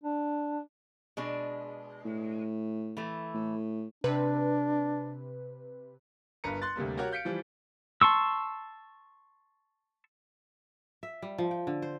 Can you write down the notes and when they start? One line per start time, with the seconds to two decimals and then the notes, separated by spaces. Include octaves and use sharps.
0.03 D4
1.17 B2 G#3 D4
2.05 A2
2.97 E3 A3
3.34 A2
4.04 C3 D4 B4
6.44 G1 G2 A#4 B4 A#5 C#7
6.62 C6 F#6 A6
6.76 D2 C3 G3 A#3
6.97 F#4 G4 A#4 C#5 F#5
7.11 F5 G6 B6 C#7 D7
7.25 E3 F3 G3
8.01 A5 C6 C#6 E6
11.03 E5
11.22 G3
11.38 F3
11.51 G5
11.67 D3
11.82 C5